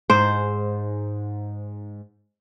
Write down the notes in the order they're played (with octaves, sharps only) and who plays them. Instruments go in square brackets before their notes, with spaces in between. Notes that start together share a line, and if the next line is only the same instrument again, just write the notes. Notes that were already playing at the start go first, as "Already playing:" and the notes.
[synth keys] G#2 [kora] C5